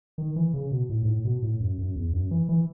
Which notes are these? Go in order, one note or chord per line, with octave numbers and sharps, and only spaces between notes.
D#3
E3
C#3
B2
A2
G#2
A2
B2
A2
F#2
F#2
E2
F#2
E3
E3